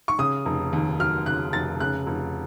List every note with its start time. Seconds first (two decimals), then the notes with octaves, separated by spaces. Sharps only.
0.08 C#6
0.18 C#3 D#6
0.46 F1
0.73 D#2
1.00 F#3 F6
1.26 C#3 F#6
1.53 F1 A6
1.80 C#3 F#6
2.07 F1